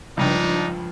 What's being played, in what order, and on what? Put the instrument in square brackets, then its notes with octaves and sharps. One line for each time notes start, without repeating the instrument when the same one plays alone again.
[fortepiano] C#2 G2 [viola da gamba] F3 [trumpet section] D4 D#4